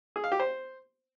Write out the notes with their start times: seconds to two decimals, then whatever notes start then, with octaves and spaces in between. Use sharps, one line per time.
0.16 G#4
0.24 F5
0.32 G4
0.40 C5